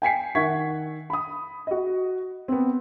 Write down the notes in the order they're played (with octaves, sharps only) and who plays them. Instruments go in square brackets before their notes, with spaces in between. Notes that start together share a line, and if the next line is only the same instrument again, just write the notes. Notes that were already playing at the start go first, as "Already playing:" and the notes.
[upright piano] G5 G#5 B6 C7
D#3 E5 F#5 C#6 G#6 B6
B5 D#6
F#4 D#5
B3 C4